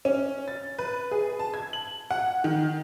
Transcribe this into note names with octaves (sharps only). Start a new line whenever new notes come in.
C#4
A6
B4
G#4
A5
G#6
F#7
F#5
D#3